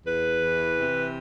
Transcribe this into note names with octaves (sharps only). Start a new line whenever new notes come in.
E2 B4
E3
C3